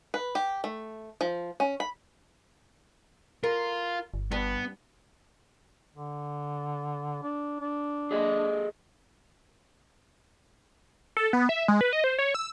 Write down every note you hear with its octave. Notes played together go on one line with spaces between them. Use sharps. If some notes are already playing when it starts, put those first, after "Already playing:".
B4
G4
A3
F3
C#4
B5
F4 A#4
G1
G2 B3
D3
D4
D4
G#4 A4 D#5
A4
B3
E5
G#3
B4
D#5
C5
C#5
E6